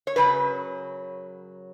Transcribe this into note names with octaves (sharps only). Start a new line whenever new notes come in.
C#5
F#2 C#3 F#3 B4